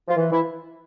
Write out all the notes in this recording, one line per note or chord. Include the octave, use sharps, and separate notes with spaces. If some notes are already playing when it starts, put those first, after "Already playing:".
F3 F4
E3
E3 E4